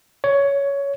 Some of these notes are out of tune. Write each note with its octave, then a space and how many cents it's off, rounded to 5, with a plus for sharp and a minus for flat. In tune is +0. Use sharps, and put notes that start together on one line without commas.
C#5 +15